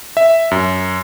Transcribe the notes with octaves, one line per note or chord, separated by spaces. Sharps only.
E5
F#2